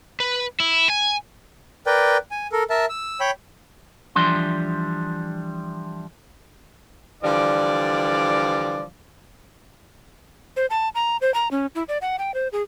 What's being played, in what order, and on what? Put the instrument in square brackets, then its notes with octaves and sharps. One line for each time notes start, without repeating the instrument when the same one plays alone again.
[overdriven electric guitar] B4
E4
G#5
[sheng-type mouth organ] A#4 B4 D5 G5
G#5
A4 A#4
A#4 E5 A5
E6
C#5 G5 B5
[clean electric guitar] E3 F3 G3 D4 C6
[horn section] D3 E3 F3 G3 D5
[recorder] C5
A5
A#5
C5
A#5
C#4
E4
D5
F#5
G5
C5
G#4